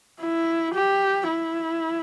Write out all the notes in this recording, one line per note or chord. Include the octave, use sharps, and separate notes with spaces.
E4
G4
E4